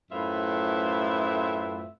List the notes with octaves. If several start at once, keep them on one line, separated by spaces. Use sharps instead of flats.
F#2 A2 C4 F4 B4 E5